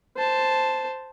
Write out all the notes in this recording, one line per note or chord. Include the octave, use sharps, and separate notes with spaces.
C5 A5